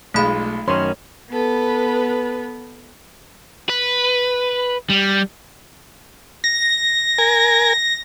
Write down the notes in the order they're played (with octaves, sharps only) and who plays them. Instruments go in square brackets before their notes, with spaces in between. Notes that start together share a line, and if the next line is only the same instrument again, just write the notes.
[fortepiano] B1 G#3 F4 [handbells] A3 B5
[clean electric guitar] F#2 D#3 C#4 [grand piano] C#5 [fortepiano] C6
[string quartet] B3 A4 B4
[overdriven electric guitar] B4
G3
[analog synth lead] A#6
[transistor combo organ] A#4 G#5